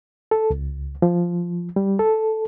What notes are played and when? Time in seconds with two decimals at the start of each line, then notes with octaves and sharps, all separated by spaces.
0.31 A4
0.50 C#2
1.02 F3
1.76 G3
1.99 A4